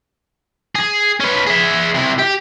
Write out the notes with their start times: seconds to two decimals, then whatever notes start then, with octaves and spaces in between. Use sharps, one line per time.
0.75 G#4
1.20 C#4 B4
1.47 G#4 E5
1.95 C3 E4
2.19 G4